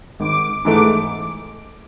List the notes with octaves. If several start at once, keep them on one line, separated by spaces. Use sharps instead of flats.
G#1 D6
G#2 E3 A3 D6